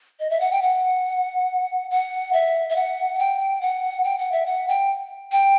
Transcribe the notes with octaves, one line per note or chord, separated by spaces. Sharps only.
D#5
E5
F#5
G5
F#5
F#5
E5
E5
F#5
G5
F#5
G5
F#5
E5
F#5
G5
G5